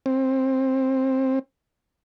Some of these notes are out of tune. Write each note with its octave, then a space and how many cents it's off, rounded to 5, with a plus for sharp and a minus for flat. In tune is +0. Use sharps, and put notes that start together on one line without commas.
C4 +15